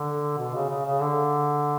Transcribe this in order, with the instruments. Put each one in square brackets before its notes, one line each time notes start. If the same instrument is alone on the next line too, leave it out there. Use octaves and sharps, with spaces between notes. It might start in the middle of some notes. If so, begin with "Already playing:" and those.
Already playing: [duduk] D3
B2
C#3
C#3
C#3
D3